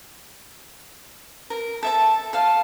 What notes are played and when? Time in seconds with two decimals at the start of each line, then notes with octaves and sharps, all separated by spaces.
1.50 A#4
1.83 A4 E5 A5
2.33 A4 F5